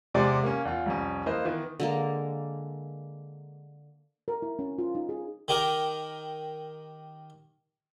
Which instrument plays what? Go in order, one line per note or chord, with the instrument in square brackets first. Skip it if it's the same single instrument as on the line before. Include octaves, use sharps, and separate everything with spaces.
[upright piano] E2 C3 G#3 D5 C6
A#3 C#4
E2 F4
C2 F2 C#4
E3 A#3 B4 C5 D#5
D#3 E3 B3
[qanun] D3 G#3 A#3
[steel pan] A#4
E4
C#4
F4
D#4
G#4
[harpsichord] D#3 G4 A#4